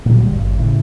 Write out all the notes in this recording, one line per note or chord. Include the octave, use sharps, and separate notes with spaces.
A#2 F#3
D2 G3
G#1 G2
A2 C#3